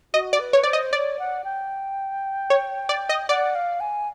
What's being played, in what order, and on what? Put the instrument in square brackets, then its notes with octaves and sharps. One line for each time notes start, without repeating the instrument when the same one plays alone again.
[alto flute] F#4 [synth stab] D#5
[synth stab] D5
[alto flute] B4
[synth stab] C#5
[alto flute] C5 [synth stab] D5
[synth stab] D#5
[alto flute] C#5 [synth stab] D5
[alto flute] F#5
G5
[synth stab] C#5
D5
D#5
[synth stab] D5 [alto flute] F#5
[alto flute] F5
G#5